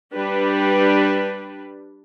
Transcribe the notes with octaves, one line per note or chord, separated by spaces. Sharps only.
G3 D4 G4 B4